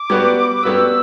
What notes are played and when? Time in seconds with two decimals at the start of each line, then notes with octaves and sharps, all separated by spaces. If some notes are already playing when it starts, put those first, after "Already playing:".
Already playing: D6
0.10 G3 B3 F#4 B4
0.63 G3 B3 F#4 B4 E6